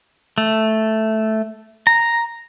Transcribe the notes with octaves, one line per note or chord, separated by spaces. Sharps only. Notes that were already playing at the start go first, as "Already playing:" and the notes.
A3
A#5